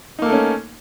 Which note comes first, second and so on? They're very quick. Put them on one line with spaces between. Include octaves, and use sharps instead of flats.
D#4 A#3 A4 A3 C#4